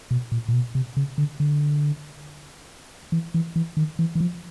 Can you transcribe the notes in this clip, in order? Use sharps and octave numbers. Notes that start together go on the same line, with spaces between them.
B2
A#2
A#2
B2
C3
C#3
D3
D3
E3
E3
E3
D#3
E3
E3
F3